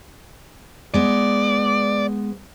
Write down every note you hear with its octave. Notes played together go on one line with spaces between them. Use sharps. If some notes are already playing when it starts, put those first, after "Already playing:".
G#3 B3 D5